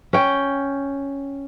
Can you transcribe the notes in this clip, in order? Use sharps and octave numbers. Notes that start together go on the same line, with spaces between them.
C#4 G5